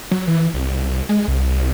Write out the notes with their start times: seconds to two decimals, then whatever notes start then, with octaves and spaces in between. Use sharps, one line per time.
0.11 F#3
0.27 E3
0.54 C2
1.09 G#3
1.28 C2